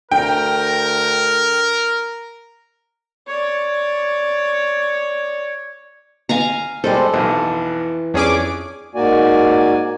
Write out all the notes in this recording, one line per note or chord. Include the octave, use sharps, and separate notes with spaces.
D2 A#4 G5
C#5 D5
F5 G#5 A#5
G3 G#3 A4 C5
B1 F2 E3
F2 C#4 D4 G#4 D6
G#2 A#3 F#4 D5 G#5